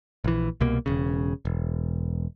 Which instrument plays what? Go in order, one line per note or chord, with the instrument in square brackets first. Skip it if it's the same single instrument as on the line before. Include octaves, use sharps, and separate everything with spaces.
[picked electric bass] A#1 E3
C2 B2 A#3
E1 C#3
E1